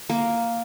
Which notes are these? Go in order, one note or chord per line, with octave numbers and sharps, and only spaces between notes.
A#3